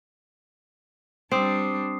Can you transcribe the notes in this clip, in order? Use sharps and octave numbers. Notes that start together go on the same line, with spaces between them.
G3 C4 D4 D6 D#6 C7